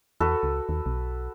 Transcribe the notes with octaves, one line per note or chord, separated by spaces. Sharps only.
E2 F#4 A4 B4
C#2
D#2
B1